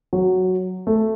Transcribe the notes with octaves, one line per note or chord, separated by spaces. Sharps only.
F#3
A3